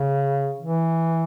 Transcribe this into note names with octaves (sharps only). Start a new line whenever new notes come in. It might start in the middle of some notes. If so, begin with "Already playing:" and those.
Already playing: C#3
E3